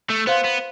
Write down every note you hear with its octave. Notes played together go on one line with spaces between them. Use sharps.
A3
B3 C5 F5 C6
B3